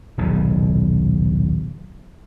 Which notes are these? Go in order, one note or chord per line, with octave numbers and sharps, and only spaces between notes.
D#1 B1 C#3